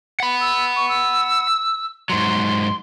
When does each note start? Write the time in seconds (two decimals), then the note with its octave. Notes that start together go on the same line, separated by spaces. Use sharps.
0.20 F#5 B5
0.41 E6
0.76 C#6
0.89 E6
2.10 G#2 F#3 C6